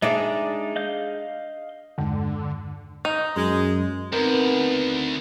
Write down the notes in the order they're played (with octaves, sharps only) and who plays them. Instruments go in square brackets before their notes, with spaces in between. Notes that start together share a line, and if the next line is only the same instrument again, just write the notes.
[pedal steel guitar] G#3 D#4 D5 [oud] D4 G#4 E5
[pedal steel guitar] D#5 F5 G6
[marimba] E2 G2 G#3 [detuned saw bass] D3
[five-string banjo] D#4
[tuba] F#2 [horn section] G#3
[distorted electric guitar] D2 [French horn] B3 [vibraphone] C4 D#4 [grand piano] A#4